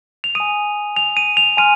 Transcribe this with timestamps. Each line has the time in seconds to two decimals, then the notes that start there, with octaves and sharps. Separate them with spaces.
0.24 F7
0.35 G#5 D#6 D#7
0.96 F7
1.17 D#7
1.37 F7
1.57 G#5 C6 F6 D#7